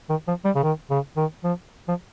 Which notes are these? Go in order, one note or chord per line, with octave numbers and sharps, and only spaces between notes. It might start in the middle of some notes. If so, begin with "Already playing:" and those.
D#3
F3
G3
C#3
D#3
C#3
D#3
F3
F3